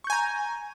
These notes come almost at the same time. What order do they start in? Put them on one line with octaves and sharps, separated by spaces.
C#6 G6 G#5 A#5